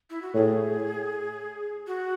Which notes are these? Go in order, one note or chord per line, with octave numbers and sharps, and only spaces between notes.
E4
F#4
A2 G#4
F#4